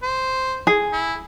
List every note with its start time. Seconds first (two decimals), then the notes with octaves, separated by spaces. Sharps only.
0.03 C5
0.67 G#4
0.92 E4